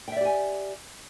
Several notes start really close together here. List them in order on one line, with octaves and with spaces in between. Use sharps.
G5 E5 D5 G4 G#5